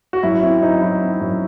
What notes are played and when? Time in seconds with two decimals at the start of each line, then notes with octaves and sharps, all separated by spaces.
0.13 F#4
0.23 F#2 E4
0.43 C4 E4
0.62 F#2 D#4
0.82 F#3 E4
1.01 C4
1.21 F#2